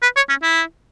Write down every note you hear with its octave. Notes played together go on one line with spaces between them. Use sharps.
B4
C#5
C#4
E4